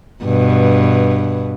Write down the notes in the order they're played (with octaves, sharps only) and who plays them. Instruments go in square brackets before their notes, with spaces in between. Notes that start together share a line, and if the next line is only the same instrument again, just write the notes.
[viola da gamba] G2 B2